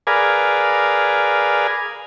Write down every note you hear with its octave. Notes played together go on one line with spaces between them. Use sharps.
G#4 A#4 B4 D5 F5 G#5